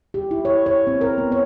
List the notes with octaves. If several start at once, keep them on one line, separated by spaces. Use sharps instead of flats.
G4
E4
C#5
C#5
C4
A#4
B3
C#5